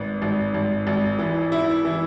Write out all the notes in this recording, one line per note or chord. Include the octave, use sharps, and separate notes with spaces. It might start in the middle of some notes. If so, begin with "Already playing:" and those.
Already playing: G#1 B3
G#1
G#1
G#1
E3
E4
E3